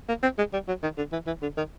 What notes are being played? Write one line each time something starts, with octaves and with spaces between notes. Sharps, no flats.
A#3
C4
G#3
G3
F#3
D#3
D3
E3
E3
D3
D#3